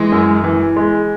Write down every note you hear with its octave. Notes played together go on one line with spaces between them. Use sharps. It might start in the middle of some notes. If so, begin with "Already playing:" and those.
Already playing: E3 G#3
F#2
E3
G#3